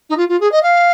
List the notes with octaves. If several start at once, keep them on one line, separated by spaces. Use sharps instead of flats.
D#4
F4
F4
G#4
D#5
F5